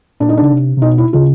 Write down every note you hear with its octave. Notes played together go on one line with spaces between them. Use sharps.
A#2 D4
D#4
D4
C#3
C3
C3
B2 D#4
E4
C#3 F4